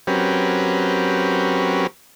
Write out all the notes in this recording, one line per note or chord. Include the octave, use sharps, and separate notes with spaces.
F#3 C4 C#4 G4 A#4 B4